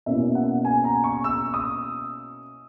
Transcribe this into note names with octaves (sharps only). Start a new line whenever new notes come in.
B2 A#3 C#4 E4 E5
F#5
G#5
A#5
C#6
E6
D#6